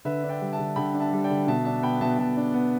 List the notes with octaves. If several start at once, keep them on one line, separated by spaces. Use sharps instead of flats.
D3 B4 E5
D4
D5 G5
G3
E5 A5
D3
D3 G5 B5
D4
E5 A5
G3
D5 G5
D3
B2 E5 A5
D4 E5 A5
B3 G5 B5
B2 E5 A5
B2 E5 A5
D4
B3